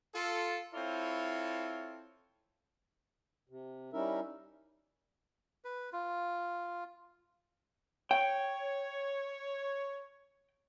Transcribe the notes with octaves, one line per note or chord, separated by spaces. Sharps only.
F4 A4
C4 E4 F4 A4 C#5
C3
G3 C#4 D#4 E4 A#4 E5
B4
F4
C#5 G5